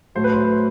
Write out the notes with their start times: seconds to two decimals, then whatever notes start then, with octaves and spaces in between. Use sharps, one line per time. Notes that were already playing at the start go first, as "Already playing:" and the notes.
0.15 A2 F#3 A3 C5
0.24 B4
0.33 C5